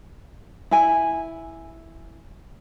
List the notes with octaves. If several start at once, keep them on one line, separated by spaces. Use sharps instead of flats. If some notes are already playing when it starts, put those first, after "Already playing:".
E4 G#5